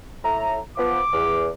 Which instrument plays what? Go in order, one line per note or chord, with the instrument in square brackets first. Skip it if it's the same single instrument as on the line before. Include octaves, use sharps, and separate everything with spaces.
[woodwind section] A2 E5 A#5
[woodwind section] F3 B3 [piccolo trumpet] D6
[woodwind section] E2